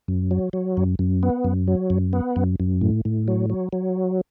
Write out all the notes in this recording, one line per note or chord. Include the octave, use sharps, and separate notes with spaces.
F#2
F#3
F#3
F#2
F#2
B3
F#2
F#3
F#2
B3
F#2
F#2
A2
A2
F#3
F#3
F#3